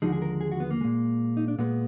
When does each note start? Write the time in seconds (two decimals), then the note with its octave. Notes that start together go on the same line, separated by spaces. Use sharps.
0.02 D#2 D3 F3 G#3 D#4 F#4
0.12 G#4
0.22 A#4
0.41 G#4
0.52 F#4
0.60 B3
0.71 A#3
0.81 A#2 G#3
1.37 D#4
1.48 D4
1.59 A#2 G#3 B3